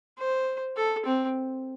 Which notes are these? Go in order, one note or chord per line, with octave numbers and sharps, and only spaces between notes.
C5
A4
C4